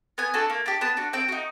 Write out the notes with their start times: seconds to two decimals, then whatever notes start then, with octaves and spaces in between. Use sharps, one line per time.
0.18 B3 G#5
0.34 D4 F#4 A4
0.50 A#3
0.66 D4 G4
0.81 B3 A5
0.97 D4 F#4
1.13 C4 G5
1.29 D#4 F#4